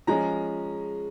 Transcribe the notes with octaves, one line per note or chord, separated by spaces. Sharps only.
F3 G#3 C#4 A#5